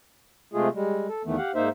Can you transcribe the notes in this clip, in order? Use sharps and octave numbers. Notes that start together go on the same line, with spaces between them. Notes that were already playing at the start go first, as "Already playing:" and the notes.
C3 G#3 A3 F4 G#4
G3 G#3
A4
E2 D#3 E3 A3 B3
G4 F5 F#5
G#2 A#3 D#4 C5 E5